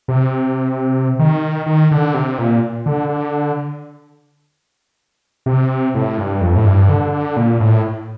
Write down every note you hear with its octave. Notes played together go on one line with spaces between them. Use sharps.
C3
D#3
D#3
D3
C3
A#2
D3
D3
C3
A2
G2
F2
A2
G2
D3
D3
A#2
A2